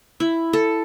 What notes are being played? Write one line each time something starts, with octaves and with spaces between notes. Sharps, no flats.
E4
A4